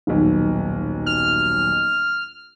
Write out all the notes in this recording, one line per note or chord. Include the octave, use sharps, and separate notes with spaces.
D#1 B1
F6